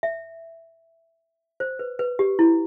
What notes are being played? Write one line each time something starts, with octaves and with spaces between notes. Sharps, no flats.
E5
C5
B4
B4
G4
E4